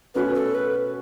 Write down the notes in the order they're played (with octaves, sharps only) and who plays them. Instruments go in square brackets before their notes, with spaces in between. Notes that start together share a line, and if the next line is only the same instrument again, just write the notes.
[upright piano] B2 A3 C#4 F#4 [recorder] B4
[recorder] A4
B4